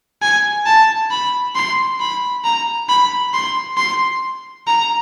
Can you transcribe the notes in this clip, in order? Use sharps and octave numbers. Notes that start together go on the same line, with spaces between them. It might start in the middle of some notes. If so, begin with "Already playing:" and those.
G#5
A5
B5
C6
B5
A#5
B5
C6
C6
A#5